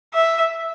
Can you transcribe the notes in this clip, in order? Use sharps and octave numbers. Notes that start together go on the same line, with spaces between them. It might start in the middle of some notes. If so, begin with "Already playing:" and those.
E5